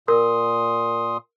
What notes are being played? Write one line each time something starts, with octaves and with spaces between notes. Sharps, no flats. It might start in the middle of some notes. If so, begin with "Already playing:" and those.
A#2 A#4 C6 D#6